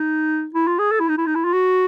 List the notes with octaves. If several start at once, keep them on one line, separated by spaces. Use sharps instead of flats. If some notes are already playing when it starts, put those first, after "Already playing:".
Already playing: D#4
E4
F4
G#4
A4
E4
D#4
E4
D#4
E4
F4
F#4